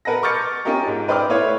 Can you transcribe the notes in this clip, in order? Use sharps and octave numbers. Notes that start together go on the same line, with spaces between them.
A#4 B4 F#5 A5 A#6
C#6 D6 F6 G6 A6 C#7
C#4 D#4 F4 G4 A#4
G#2
B4 C5 D5 G5 D6 F6
A3 E4 B4 C#5 F5